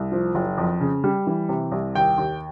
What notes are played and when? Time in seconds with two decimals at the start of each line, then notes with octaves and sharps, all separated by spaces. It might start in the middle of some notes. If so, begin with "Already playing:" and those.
Already playing: C2
0.12 F3
0.35 F#1
0.58 F2
0.80 C#3
1.04 G3
1.27 E3
1.49 C3
1.72 C2
1.95 D#2 G5
2.18 D#2